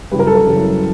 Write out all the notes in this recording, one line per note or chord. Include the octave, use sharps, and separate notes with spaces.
F#2 C#3 E3 G3 B4
A#4
A4
A#4
F#2 C#3 E3 G3